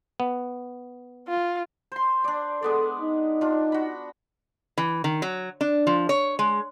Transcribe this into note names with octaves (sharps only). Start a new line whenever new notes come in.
B3
F4
C5 C6
D4 D5
G#3 B3 A4 D5
D#4
D4 F4
F#4 B5
E3
D#3
F#3
D4
F3
C#5
G#3